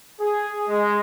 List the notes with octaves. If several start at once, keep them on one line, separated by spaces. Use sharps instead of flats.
G#4
G#3